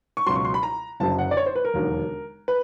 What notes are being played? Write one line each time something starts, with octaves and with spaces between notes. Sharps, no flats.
C#6
C#2 B2 F#3 C6
C#6
C6
B5
A#5
F#1 F#2 D3 F#3 A5
F#5
D5
C#5
C5
B4
A#4
E1 D#2 D3 F#3
B4